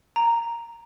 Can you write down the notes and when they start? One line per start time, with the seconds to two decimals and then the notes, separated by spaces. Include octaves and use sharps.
0.16 A#5